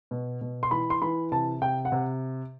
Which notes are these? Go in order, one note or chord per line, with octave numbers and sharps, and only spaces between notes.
B2
B2
C6
E3 B5
C6
E3 B5
C3 A5
C3 G5
F#5
C3